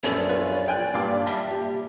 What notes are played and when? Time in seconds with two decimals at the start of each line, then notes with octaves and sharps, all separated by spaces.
0.03 A#1 F#2 B3 C#4 A4 D5
0.29 F4 B4 C#5
0.68 G5 G#5 F#6
0.94 G2 A#2 F5 D6
1.26 G3 E5 A5
1.51 G4